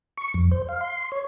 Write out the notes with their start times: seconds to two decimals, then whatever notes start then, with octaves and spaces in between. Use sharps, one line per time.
0.17 C#6
0.34 F2
0.51 C5
0.69 F5
0.81 C6
1.12 C#5